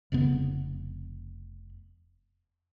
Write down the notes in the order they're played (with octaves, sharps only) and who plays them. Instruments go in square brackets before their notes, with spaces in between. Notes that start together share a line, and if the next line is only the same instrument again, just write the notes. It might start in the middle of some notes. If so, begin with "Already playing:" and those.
[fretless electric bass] F1 F2 C#3 B3